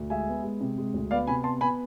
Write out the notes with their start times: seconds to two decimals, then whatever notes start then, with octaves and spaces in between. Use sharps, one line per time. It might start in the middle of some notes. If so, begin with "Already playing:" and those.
Already playing: D2
0.10 G#3 E5 G#5
0.28 B3
0.44 G#3
0.61 C3
0.78 G#3
0.94 D2
1.11 B3 D5 F5
1.27 C3 G#5 B5
1.44 B3 A5 C6
1.61 B3 G#5 B5